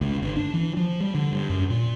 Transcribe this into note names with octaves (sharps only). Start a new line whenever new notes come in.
C#2
G1
D4
E3
F3
G3
D3
G2
F#2
A#2